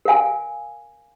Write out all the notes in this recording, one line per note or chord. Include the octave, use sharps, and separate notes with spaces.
A#4 F5 G#5